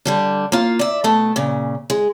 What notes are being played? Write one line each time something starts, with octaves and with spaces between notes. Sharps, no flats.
D3 G3 D4
A#3 F4
D5 E5
B2 A3 A4
A#2 C#3
G#3